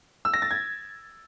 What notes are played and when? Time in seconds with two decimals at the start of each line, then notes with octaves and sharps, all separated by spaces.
0.25 E6
0.34 A#6
0.42 A6
0.51 G#6